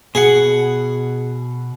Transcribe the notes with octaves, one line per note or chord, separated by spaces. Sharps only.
B2 G#4 F#5